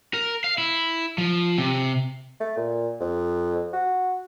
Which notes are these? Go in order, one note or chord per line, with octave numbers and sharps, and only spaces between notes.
A#4
F5
E4
F3
C3
A3
A#2
F2
F#4